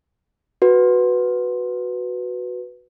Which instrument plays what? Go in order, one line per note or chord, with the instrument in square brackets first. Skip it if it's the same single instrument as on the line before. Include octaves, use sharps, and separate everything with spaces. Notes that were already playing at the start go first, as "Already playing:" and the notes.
[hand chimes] F#4 B4